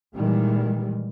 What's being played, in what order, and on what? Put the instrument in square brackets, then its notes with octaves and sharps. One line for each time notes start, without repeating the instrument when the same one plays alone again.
[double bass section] A#2 D#3 E3 G3 G#3